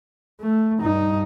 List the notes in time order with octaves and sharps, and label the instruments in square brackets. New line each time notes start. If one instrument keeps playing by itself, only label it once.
[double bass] A3
G2 D#4